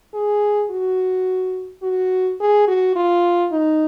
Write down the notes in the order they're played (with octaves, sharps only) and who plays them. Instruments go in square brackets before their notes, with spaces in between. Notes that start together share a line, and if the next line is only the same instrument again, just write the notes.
[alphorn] G#4
F#4
F#4
G#4
F#4
F4
D#4